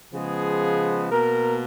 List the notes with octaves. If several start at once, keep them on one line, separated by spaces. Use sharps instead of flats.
C#3 F3 G#3 B3 G#4
B2 A#3 A#4